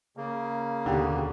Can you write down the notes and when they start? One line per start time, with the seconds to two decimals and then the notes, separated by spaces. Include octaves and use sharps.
0.17 C#3 A#3
0.86 D#2 B2 D3 G4